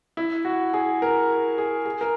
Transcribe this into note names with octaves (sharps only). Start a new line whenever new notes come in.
E4
F#4
G#4
A#4
G#4
G#4
A#4